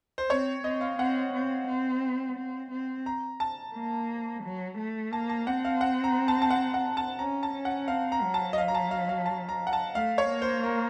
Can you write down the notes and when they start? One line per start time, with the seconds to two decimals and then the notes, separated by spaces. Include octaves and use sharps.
0.18 C5
0.30 C4 C#5
0.64 C4 D#5
0.81 F5
0.99 C4 F#5
1.34 C4
1.68 C4
2.37 C4
2.71 C4
3.06 A#5
3.40 A5
3.74 A#3
4.44 F#3
4.79 A3
5.13 A#3 A5
5.29 A5
5.47 C4 F#5
5.65 F5
5.81 F#5
6.04 A#5
6.28 A5
6.42 A5
6.50 F#5
6.74 F#5
6.97 A5
7.19 C#4 A#5
7.43 A5
7.54 C#4
7.65 F#5
7.88 C4 F5
8.12 A#5
8.22 F#3
8.34 A5
8.53 D#5
8.58 F5
8.68 A#5
8.75 A5
8.91 F5
9.09 F5
9.26 A5
9.49 A#5
9.67 F#5
9.73 A5
9.95 A3 F5
10.18 C#5
10.30 A#3
10.42 C5
10.64 A#4